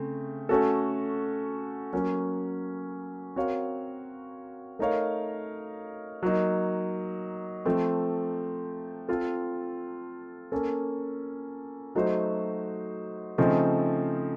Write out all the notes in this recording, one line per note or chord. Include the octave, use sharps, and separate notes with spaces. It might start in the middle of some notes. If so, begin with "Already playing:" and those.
Already playing: C#3 A3 C4
A3 C#4 F#4 A4
F#3 A#3 C#4
C4 F#4 A#4 C#5 F5
A3 D#4 A#4 C#5 F5
F#3 A#3 D#4
F3 A3 C4
C4 F4 A4
A#3 C#4 A4
F#3 A3 D#4 F#4 C5
C#3 F3 A3 C4 D#4